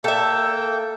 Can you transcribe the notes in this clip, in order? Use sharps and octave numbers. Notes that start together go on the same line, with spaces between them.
A#3 A4 E5 G5